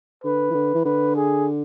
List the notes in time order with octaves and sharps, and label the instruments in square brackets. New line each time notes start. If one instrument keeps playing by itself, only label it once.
[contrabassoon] D3 [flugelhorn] B4
[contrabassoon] E3
D3
E3
[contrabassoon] D3 [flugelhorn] B4
[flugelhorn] G#4